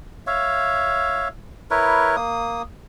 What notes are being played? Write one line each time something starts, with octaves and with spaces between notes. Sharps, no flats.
C#5 E5 F5
E4 A#4 B4 C#5
A#3 D#6